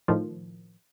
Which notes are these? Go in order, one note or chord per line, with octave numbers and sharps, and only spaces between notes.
A2 D#3 F3